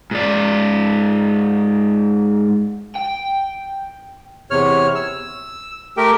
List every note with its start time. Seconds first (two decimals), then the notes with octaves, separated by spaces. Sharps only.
0.11 G#2 D5
2.95 G5
4.51 E2 C3 C#5 F6
4.95 E6
5.97 A3 G4 A#4 G5